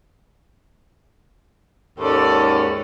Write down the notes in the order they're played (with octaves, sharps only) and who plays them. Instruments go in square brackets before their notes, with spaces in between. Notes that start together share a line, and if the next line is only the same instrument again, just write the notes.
[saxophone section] D#2 G#2 C#4 [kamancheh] A4 D5